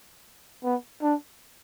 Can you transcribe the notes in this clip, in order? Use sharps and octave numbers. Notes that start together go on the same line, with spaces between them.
B3
D4